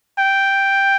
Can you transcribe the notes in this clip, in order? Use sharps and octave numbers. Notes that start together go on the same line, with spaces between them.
G5